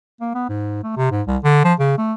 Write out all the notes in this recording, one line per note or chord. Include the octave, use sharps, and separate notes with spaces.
A#3
B3
G#2
A3
C3
G#2
C2
D3
F3
C#3
A3